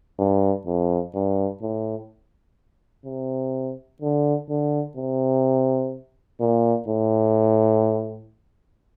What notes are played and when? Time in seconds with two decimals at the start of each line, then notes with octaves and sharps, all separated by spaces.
0.19 G2
0.66 F2
1.15 G2
1.62 A2
3.05 C3
4.02 D3
4.49 D3
4.97 C3
6.41 A#2
6.88 A2